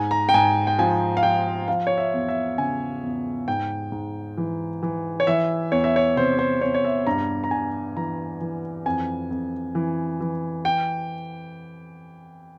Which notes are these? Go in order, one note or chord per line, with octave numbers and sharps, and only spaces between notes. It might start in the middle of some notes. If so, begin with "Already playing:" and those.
Already playing: G#2 G#5
A#5
G5
G#2 G#5
G5
F3 G#5
F5
F3 G5
F3 F5
C#5
E5
E2
E5
C#3 G#5
E2
G#2 G5
G#2
E3
E3
C#5
E3 E5
E2 C#5
E5
C#5
C3 C5
C5
E2 C#5
C#5
E5
G2 A#5
A#5
G2 G#5
E3 A#5
E3
F2 G#5
F2
E3
E3
G5